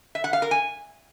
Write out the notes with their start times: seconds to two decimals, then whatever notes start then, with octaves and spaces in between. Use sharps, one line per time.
0.15 E5
0.24 F#5
0.33 F5
0.42 A#4
0.51 G#5